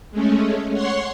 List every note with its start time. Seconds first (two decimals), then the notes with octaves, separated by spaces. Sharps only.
0.12 G#3 A3 C#4
0.73 C#5 F#5 C6 C#6